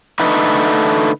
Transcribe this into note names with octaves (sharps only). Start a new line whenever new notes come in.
D3 A3 D#4 B4